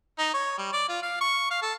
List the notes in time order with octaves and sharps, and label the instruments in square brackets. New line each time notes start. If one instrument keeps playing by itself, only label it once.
[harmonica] D#4
C#5
G3
D5
F4
F5
C#6
F5
A4